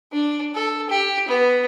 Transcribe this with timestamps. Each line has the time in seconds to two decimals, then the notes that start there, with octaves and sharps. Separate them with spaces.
0.12 D4
0.54 A4
0.89 G4
1.28 B3